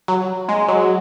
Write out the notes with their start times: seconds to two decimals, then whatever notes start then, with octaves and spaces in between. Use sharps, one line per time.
0.08 F#3
0.49 G#3
0.68 F#3